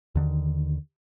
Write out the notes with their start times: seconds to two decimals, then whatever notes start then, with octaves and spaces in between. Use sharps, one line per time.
0.15 D#2 D3 D#3